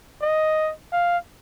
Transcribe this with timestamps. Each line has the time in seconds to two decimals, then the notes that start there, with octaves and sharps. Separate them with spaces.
0.22 D#5
0.93 F5